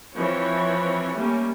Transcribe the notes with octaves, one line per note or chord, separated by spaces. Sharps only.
E3 F3 C4 C#5
G3 A3 A#3 C#4